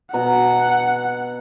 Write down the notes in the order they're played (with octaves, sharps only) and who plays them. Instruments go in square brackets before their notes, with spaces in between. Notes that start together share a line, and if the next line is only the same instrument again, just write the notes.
[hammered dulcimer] B2 A#5 [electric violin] F#5